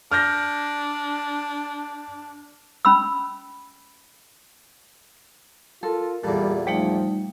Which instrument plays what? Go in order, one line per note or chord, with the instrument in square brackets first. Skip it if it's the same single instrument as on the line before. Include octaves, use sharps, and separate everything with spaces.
[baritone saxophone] D4 [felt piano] F6 G6 A#6
[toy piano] C#4 B5 E6
[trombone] F4 [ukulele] A4 [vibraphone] A#4
[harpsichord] E2 A#2 [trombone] G3 [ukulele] A4
[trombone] F3 [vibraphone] G3 A3 D#4 [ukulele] G5